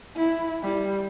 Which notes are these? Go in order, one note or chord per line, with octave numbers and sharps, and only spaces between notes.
E4
G3